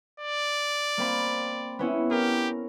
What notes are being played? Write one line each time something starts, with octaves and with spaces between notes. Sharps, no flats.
D5
A#3 C4 B5
B3 C#4 E4
G4 A#4